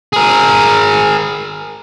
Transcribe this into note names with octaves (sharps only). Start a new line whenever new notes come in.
G#4 A#4